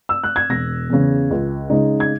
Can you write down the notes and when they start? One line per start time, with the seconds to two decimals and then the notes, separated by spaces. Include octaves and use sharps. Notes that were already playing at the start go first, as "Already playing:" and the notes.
0.09 E6
0.23 F#6
0.36 G#6
0.50 E1 A#6
0.90 E2 C#3
1.31 C#2
1.70 C#3 G#3 D#4
2.00 G#6